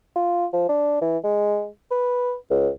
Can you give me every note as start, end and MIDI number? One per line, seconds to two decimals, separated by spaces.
0.16 0.46 65
0.53 0.66 53
0.69 1.01 62
1.01 1.18 52
1.24 1.67 56
1.91 2.35 71
2.50 2.69 37